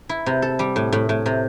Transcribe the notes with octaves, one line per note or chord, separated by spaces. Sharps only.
E4
C3
A4
G3
A2
A2
A2
C3